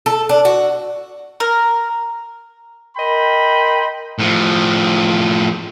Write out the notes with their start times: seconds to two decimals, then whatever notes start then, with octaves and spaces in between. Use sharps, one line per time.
0.06 A4
0.29 D4
0.45 F#4
1.40 A#4
2.97 A#4 D#5 G5 B5 C6
4.19 A2 F3